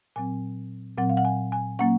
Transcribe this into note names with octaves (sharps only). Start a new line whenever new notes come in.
A#2 F#3 C4 G#5
A#2 F#3 C4 F#5
F5
F#5
G#5
G#5
F#3 A#3 C#4 F#5